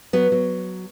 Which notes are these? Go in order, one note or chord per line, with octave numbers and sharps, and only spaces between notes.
F#3 B3
F#3